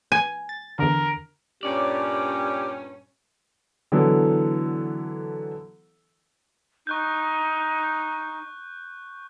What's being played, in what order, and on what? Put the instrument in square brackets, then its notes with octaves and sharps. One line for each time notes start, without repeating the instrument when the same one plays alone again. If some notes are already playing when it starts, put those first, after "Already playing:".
[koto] G#5
[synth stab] A6
[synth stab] E2 D3 [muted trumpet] A#4
[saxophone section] G2 A#2 C#4 [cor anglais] G4 [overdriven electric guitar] D5
[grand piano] D3 E3 F#3 B3 E4 A4
[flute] D#4 [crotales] C#6 F#6 G6